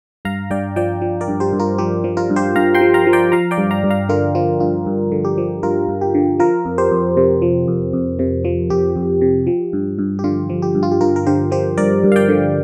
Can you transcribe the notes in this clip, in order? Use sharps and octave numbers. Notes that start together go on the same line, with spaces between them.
G2 F5 A#5
G2 D5 G5
F3 D5 G5
F3
A#4 D5
G2
G4 C5
G2
F4 A#4
F3 G4
F3
F4 A#4
G2
G4 C5
G2 F5 A#5
G5 C6
F3
F5 A#5
F3
D5 G5
F3 F5 A#5
D5 G5
G2
F5 A#5
G2
F5 A#5
D3 F4 A#4
F3 F4
G2 F4
G2
D3
G4
F3
G2 F4 A#4
G2
G4
D3
F3 F4 A#4
F2
G4 C5
F2
C3
F3
F2
F2
C3
F3
F2 G4
F2
C3
F3
G2
G2
G4
D3 F4
F3
G4
G2
F4
G4
G2 F4 A#4
A#4
D3 G4 C5
F3 G4 C5
G2 A#4 D5
G2
F5
D5 G5
D3